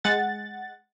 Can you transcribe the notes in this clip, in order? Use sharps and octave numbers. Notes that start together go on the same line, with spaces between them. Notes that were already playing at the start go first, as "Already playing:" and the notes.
G#3 F#5 A6